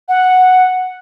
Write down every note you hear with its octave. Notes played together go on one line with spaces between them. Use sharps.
F#5